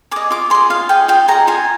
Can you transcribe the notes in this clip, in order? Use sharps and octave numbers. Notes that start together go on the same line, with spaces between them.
G#4 D#5 D6
F4 D6
G#4 D#5 C6
F4 F5
G#4 D#5 G5
F4 G5
G#4 D#5 A#5
F4 G#5